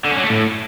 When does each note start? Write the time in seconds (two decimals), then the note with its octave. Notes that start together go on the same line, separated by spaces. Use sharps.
0.05 D3
0.11 C#4
0.17 F#3
0.24 A3
0.30 A2